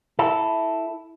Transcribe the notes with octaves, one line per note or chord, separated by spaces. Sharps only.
E4 A4